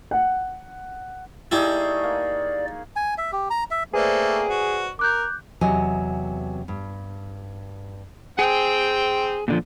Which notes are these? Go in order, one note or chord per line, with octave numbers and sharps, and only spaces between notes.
F#5
A3 D#4 E4 G4 G#4 D5
A#3
G#5
E5
G4
A#5
E5
A3 A#3 C4 G#4 B4 C5 D5
F#4
A#4 D6 F#6 G6
E2 C3 F#3 D#5 G#5
G2
C4 G#4 G5
A#2 D3 F3